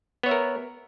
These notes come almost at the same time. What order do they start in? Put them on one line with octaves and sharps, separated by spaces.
B3 C#5 E5 A#4